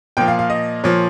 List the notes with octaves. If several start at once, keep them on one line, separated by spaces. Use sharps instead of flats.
A#2 F3 G5
F5
F5
D#5
A#2 F3 C#5